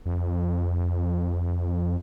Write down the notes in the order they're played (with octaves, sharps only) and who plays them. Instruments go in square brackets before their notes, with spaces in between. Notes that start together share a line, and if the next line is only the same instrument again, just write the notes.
[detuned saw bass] F2